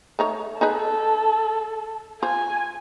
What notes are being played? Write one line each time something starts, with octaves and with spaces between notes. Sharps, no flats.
A3 D#4 C#5
D#4 G#4 A4 B4
F4 C5 G#5